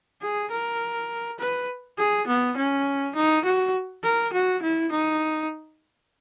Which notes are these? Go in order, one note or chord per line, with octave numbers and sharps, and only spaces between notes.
G#4
A#4
B4
G#4
B3
C#4
D#4
F#4
A#4
F#4
E4
D#4